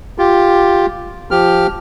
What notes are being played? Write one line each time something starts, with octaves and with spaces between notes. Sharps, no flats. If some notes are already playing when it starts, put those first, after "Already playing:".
F4 G4
F3 G4 F6